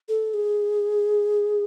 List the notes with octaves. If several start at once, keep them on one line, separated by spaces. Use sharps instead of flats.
A4
G#4